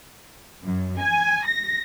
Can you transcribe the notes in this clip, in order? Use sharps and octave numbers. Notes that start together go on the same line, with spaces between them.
F#2
G#5
A#6